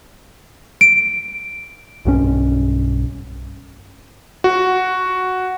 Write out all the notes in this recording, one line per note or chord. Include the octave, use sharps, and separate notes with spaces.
D7
B1 G2 F3 C#4
F#4